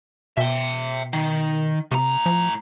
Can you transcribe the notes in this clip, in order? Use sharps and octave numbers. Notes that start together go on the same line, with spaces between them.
B2 E5 G5
D#3
A2 C3 A#5
F3